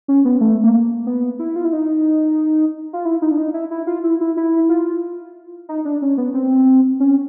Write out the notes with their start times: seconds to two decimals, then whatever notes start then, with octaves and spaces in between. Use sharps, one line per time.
0.08 C#4
0.25 B3
0.41 A3
0.63 A#3
1.06 B3
1.39 E4
1.56 F4
1.65 E4
1.73 D#4
2.93 F4
3.05 E4
3.22 D#4
3.31 D4
3.38 D#4
3.54 E4
3.71 E4
3.87 F4
4.04 E4
4.21 E4
4.37 E4
4.69 F4
5.69 D#4
5.85 D4
6.02 C#4
6.17 B3
6.34 C4
7.00 C#4